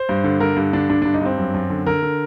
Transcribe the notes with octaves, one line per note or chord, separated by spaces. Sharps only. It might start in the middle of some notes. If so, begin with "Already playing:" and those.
Already playing: C5
G2
D3
D3 A#4
G2
D3 D4
D3 D4
G2 D4
D#4
G2 C4
F#2
F#2
D3
D3 A#4
D3